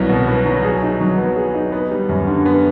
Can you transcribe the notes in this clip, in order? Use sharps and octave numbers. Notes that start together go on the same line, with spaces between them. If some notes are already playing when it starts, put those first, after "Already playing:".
Already playing: C2 F#3 B3
B2
B3
F#3
G#4
D#4
F#3
B3
G#4
D#4
B3
G3
F#2
D3
B3